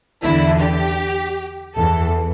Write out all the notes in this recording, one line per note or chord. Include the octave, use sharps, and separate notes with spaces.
E2 D3 E4
G4
E2 E3 A4